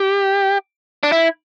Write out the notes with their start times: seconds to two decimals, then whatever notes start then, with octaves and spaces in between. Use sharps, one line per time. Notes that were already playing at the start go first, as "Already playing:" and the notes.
Already playing: G4
1.03 D4
1.12 E4